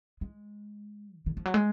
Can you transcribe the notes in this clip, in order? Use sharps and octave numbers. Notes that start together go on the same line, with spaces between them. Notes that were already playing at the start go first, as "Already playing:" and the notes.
G#3
D3
D#3
F3
F#3
G#3